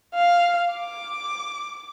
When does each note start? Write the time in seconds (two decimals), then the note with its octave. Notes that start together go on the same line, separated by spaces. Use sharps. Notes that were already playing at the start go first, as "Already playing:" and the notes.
0.15 F5
0.73 D6